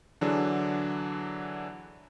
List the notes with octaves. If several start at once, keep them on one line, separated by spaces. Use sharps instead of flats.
D3 E3 F#3 D4 G#4